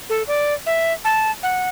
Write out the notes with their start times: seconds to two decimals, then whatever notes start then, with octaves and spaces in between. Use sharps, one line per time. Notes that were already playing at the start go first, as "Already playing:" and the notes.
0.09 A4
0.27 D5
0.66 E5
1.05 A5
1.43 F#5